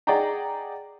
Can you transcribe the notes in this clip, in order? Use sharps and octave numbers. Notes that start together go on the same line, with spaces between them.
G#4 D5 D#5 F#5 G5 A#5